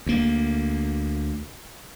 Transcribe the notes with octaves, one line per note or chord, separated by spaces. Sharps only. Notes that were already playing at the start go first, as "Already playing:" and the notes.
D2 A#3